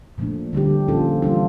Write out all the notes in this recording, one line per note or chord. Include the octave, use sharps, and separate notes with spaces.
A#2 F3 A3 D4
D3 G3 D4 G4
A#2 F3 C#4 F4 A4
E3 G3 D4 F4